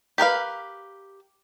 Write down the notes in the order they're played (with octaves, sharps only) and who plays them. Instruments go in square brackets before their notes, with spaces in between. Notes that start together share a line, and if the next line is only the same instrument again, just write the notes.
[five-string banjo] G4 A#4 B4 F5